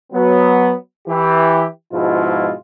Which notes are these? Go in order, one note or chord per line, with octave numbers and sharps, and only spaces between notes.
F#3 B3
E3 G4
G#2 B2 F3 G#3 E4 F4